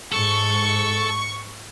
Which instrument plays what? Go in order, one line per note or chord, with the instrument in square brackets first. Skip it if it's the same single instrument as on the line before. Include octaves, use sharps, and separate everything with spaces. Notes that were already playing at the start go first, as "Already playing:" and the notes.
[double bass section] G#2 [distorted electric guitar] A4 [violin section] C#6